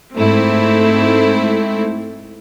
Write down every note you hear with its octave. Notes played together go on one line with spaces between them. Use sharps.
G#2 A3 C4 E4